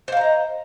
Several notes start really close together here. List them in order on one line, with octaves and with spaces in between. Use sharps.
C5 F5 A#5 D#5